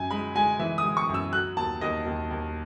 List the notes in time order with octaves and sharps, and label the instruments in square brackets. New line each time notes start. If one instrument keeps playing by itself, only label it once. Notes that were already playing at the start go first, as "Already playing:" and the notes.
Already playing: [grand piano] F#2 G#5
G#3 B5
G#3 G#5
E3 E5
D#6
G#3
C#6
F#2
E6
F#3 F#6
D#2 A5
D#2 D#5
D#2
D#2